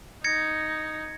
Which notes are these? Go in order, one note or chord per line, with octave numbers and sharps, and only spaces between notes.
D#4 G#6 A#6 C#7